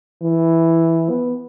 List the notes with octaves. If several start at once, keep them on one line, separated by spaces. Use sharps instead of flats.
E3
B3